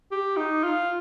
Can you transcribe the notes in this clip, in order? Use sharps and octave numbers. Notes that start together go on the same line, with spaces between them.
G4
D#4
F4